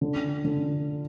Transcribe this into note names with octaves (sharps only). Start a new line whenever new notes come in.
D3
D3